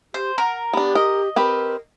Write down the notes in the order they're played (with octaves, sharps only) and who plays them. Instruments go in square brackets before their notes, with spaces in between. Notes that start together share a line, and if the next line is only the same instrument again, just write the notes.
[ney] G4 [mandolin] C5
[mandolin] A#4 [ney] F#5
[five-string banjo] B3 D4 [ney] G4
[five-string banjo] A#4 [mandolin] D#5
[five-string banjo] C4 G4 B4 [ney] A#4